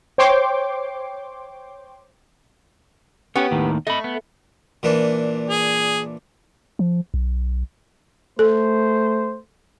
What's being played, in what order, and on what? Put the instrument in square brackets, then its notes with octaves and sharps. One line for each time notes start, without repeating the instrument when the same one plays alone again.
[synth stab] C5 C#5 G5 C6 D6
[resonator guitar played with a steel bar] B3 G4 [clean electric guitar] C#4 C#5
[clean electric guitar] D#2 A2 D#3
[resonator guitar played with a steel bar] A3 [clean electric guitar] D#5 B5
[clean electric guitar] B3
[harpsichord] A#2 E3 D4
[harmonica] G#4
[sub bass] F3
B1
[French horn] A3 [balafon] A4 [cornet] C5